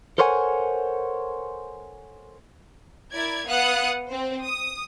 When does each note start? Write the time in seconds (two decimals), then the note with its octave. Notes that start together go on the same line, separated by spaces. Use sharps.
0.18 A4 A#4 C5 C#5 F#5 G#5
3.13 E4 A#4 D5 G#6
3.47 B3 F5 F#5 D#6 F#6
4.09 C4 C5
4.45 D#6